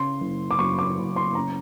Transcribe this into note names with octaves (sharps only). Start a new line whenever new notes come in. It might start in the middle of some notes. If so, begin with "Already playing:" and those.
Already playing: C#3 C6
F#1
D6
F#2 C#6
D6
F#1
C6
C#3 A#5